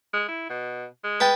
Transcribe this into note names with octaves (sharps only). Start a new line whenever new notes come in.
G#3
E4
B2
G#3
B4 G5 A5